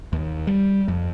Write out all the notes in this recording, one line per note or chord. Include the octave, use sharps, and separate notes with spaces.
D#2
G3
F2